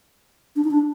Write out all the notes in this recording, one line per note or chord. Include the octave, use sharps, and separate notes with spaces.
D4
D#4
D4